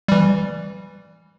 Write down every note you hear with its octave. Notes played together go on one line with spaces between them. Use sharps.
E3 G3